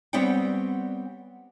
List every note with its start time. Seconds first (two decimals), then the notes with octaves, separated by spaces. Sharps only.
0.13 G3 B3 C4 C#5 F#5 G5